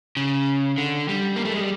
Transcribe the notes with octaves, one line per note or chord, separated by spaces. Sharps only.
C#3
D3
G3
A#3
A3
G#3
G3